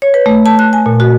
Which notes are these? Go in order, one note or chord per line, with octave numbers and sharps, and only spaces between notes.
C#5
B4
A3
A5
F#6
G#5
A#2
F#4